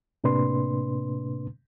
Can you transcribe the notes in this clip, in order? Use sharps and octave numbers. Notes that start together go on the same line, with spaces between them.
A2 C3 A#3 D4 B4 C6